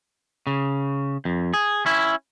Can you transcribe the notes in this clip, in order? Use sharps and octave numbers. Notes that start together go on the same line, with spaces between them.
C#3
F2
G#4
C#4 E4